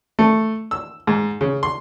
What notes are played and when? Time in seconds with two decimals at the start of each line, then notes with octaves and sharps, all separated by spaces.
0.19 A3
0.71 E6
1.07 G#2
1.41 C#3
1.63 C6